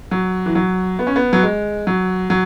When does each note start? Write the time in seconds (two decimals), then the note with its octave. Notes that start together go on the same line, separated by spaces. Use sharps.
0.11 F#3
0.46 E3
0.55 F#3
0.99 B3
1.07 C#4
1.16 B3
1.33 F#3
1.43 G#3
1.87 F#3
2.30 F#3